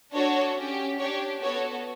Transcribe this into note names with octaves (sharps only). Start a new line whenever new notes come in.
D4 F#4 A4 C#5
C#4 G4
D4 G4 C#5
B3 F#4 A4 C#5